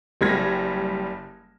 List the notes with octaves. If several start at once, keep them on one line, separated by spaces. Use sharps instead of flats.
F#1 G3 G#6 A#6